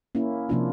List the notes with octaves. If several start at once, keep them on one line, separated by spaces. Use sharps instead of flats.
A#3 C#4 E4
C3 F3 A#3 D4 F4